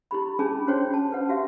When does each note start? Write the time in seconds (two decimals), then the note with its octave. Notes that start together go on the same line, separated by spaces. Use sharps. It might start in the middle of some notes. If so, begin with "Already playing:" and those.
0.11 E4 G4 B5
0.39 C#4 D4 E4 G#4 A5 B5
0.67 C#4 F#4 C5 C#5 G5
0.94 A5
1.12 B4 F#5
1.29 F#4 G4 E5 F5